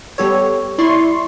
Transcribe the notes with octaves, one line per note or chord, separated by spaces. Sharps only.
G3 B3 G4 A4 C#5
E4 D5 C6 C#6 C7